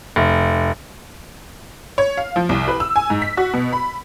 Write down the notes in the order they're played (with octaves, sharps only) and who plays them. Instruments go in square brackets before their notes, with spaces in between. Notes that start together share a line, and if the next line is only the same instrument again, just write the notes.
[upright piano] F1
[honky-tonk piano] C#5
F5
F3
C2
B4
E6
G#5
G#2
B6
F#4
B2
B5